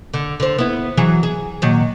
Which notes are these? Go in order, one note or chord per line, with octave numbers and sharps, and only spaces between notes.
D3
D3 C5
B3 E4
E3 F#3 G#4
G#4
A#2 D#3 F#3